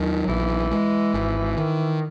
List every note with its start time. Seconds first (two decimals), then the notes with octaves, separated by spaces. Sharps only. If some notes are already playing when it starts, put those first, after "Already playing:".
Already playing: D#2 D#3 F#3
0.28 A#1 E3
0.71 G#3
1.14 G#1
1.57 D#3